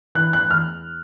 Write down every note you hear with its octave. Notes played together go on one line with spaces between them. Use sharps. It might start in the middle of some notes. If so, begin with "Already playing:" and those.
E3 F#6
F#6
E2 F6